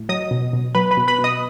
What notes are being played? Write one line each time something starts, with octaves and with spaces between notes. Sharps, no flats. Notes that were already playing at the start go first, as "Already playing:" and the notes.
Already playing: A2
F#3 D#5 D#6
B2
B2
F#3 B4 B5
B4 B5
B2
B4 B5
B2
D#5 D#6